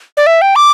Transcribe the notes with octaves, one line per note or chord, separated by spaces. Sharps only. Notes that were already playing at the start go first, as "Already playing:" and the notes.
D5
E5
G5
D6